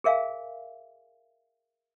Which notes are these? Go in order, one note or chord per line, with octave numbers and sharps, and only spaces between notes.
G#4 A#4 E5 F5 G#5